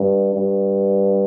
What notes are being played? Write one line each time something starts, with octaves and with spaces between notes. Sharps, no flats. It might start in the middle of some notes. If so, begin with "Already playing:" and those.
Already playing: G2
G2